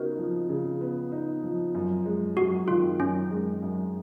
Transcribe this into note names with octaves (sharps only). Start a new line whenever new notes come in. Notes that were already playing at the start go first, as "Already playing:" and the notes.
Already playing: C#3 B3 D#4 F#4 A#4
F3
C#3
B3
D#4
F3
F#2
G#3
F#2 F#4
D#3 F4
F#2 C#4
G#3
F#2